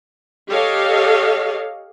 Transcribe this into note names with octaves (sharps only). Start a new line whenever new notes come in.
G4 A4 C#5 D#5 F5